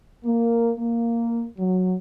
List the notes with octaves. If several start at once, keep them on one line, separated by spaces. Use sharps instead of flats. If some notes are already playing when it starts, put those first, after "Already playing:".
A#3
A#3
F#3